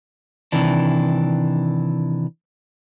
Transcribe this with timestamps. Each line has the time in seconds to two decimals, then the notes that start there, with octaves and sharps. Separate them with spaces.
0.52 C3 D#3 E3 D4